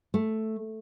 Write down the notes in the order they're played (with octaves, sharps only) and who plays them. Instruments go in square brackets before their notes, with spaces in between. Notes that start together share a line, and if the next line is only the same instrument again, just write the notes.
[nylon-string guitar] A3